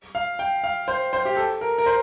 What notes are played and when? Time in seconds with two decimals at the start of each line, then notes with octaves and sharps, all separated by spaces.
0.15 F5
0.39 G5
0.64 F5
0.88 C5
1.13 C5
1.25 G4
1.37 A4
1.61 A#4
1.78 A#4
1.86 C5